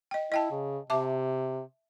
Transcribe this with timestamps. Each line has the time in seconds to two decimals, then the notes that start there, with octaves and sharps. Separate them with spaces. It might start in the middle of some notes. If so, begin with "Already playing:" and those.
0.11 D#5 G5
0.32 E4 D#5 G5 A5
0.51 C#3
0.90 C3 E5 A5 D6